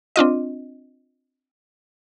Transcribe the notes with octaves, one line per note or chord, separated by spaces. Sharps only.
C4 D4 F4 D#5